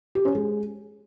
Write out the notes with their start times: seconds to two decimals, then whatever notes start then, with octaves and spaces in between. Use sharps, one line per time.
0.15 G4
0.25 C#4
0.35 G#3